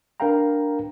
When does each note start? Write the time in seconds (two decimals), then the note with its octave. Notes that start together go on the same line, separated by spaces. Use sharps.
0.20 D4 A#4 B4 F5 G5 A#5